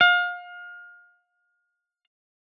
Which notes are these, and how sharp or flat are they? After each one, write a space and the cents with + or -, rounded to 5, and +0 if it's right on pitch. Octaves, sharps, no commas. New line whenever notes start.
F5 +30